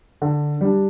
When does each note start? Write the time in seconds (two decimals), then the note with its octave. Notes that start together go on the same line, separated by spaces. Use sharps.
0.22 D3
0.61 G3 D4